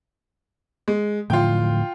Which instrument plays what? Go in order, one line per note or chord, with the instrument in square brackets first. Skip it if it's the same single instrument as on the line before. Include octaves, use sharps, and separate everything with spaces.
[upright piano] G#3
[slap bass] A2 D3 F3 [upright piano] F4 G5